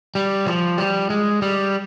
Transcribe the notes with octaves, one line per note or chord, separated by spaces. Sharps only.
G3
F3
G3
G#3
G3